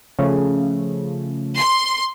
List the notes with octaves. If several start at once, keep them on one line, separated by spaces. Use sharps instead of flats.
C#3 F3 A3
C6